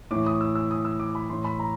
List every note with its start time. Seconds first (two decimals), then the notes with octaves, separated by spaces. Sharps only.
0.11 A2 E3 D6
0.26 D#6
0.41 E6
0.55 E6
0.71 D#6
0.85 E6
1.00 D6
1.15 B5
1.30 A2 E3 C6
1.44 B5
1.59 A#5